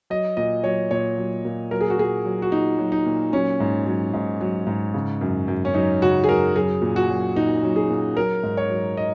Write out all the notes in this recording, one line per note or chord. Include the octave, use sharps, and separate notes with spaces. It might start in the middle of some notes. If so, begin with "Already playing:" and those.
F#3 D#5
A#2 D#5
F#3 C#5
A#2 C#5
F#3
A#2
F#3 A#4
G#4
F#4
A#2 G#4
F#3
F#4
A#2 D#4
F#3
D#4
A#2
F#3 C#4
G#2
F#3
G#2
F#3
G#2
C#3
F#2
F#2
C#4
F#3 D#4
C#3 F#4
G#4
F#2 A#4
F#3 G#4
A#2
F#4
F#3
A#2 D#4
F#3
G#4
A#2
F#3 A#4
G#2
C#5
F#3
D#5